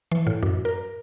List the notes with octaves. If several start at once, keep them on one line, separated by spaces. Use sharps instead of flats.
E3
A2
F#2
A#4